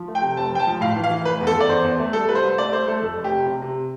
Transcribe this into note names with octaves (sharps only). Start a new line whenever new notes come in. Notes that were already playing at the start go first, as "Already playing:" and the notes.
Already playing: F3
A3
G5
C3
F1 A5
F1 G5
A5
F3
A2 F5
E3
F5
E3
F1 B4
E2
A4
E2
D5
E2 C5
E2
A3
G3 A4
C2 B4
C5
C2
A3 D5
A3 C5
A3 A4
F2 A4
F1
G4
C3
C3
C3